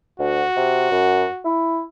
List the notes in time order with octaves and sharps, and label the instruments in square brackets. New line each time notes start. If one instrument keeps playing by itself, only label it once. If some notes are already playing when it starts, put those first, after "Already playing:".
[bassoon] D2 [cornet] F#4
[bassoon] C3
F#2
E4